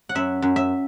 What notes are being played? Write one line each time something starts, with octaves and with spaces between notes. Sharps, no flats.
F#5
F#2 E5
F#2
E5